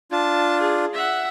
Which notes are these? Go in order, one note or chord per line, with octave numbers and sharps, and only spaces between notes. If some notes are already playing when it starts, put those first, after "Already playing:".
D4 F4 A5
G#4
E5 F#5